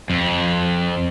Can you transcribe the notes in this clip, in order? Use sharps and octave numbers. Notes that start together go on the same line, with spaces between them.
F2